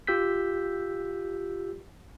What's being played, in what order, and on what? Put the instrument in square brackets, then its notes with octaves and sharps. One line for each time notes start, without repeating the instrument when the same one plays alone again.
[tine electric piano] F4 G4 E6 G6 B6